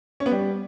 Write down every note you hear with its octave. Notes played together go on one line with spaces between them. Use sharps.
C#4
B3
G3